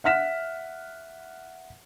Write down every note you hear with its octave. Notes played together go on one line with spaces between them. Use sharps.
E5 F#5 F6 B6 E7